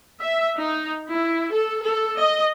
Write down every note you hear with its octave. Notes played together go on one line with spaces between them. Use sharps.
E5
D#4
E4
A4
A4
D#5